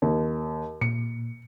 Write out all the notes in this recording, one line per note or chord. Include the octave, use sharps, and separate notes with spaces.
D#2
A#2 C#7